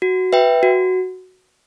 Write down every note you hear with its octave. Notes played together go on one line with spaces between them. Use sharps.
F#4
B4 E5 G5
F#4